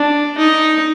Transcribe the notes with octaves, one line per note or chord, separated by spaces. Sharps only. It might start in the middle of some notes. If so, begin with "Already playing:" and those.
Already playing: D4
D#4